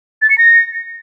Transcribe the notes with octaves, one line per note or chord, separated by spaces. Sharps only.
A6
C#7
A#6